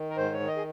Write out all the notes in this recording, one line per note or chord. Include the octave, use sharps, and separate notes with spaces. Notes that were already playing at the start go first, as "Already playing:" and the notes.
Already playing: D#3
A#4
G#2 C5
C#5
D#3
D#5
G#4